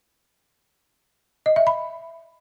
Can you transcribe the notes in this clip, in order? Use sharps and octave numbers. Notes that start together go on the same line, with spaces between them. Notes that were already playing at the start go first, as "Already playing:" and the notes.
D#5
E5
B5